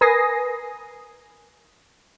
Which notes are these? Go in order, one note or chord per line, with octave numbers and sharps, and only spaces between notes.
A#4 B4 G#5 D#6 A#6 C7